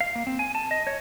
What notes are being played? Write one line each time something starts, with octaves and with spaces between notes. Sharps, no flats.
F5
A#3
C4
G#5
A5
D#5
C#5